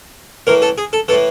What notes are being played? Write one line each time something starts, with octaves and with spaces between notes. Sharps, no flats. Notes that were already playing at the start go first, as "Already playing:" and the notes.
A2 E3 A#4
A4
G#4
A4
A2 E3 A4